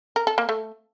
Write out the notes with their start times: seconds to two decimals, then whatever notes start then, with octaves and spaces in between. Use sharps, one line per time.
0.16 A#4
0.27 A4
0.38 A#3
0.49 A3